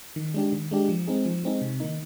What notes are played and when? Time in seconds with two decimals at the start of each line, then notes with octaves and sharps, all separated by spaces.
0.16 D#3
0.34 G#3 D4 G4
0.53 D#3
0.71 G#3 D4 G4
0.89 F3
1.07 G#3 C4 D#4 G#4
1.25 F3
1.44 G#3 C4 D#4 G#4
1.62 C3
1.80 D#3 A#3 D#4